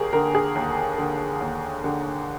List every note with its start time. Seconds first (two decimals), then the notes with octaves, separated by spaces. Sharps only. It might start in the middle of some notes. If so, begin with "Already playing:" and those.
Already playing: D#2 G4 G#4 A#4
0.13 D3 A#4
0.35 G#4
0.55 D#2
0.98 D3
1.41 D#2
1.84 D3